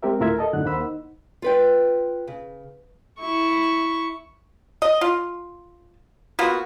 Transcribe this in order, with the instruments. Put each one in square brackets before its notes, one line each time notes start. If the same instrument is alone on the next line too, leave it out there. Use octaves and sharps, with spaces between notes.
[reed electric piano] G#3 C4 G4 A#4 E5
D2 A2 F4 A#4 E5 G#6
A4 D#5 A5
F#2 A2 D3 D#4 F#5 F#6
D#2 A#3 C5 F#5 B5 E6
D#4
[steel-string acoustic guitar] F4 B4 G5
C#3
[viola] E4 C#6
[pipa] D#5
F4
A#3 B3 F4 F#4